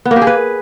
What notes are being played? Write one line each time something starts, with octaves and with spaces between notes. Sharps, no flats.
B3
A#3
G4
G#4
B4